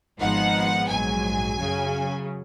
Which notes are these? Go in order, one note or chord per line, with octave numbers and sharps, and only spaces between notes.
G#1 G#2 F3 B3 D#4 F#5
A#1 G#2 F#3 G#5
F#2 C#3 F#3 C#4